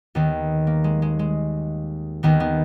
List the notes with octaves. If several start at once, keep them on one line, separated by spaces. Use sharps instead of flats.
D#2 D#3 B3
A#3
G#3
G#3
G#3
D#2 D#3 B3
B3